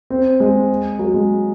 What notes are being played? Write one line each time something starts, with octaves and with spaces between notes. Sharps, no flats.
C4
G#3
F#3
G#3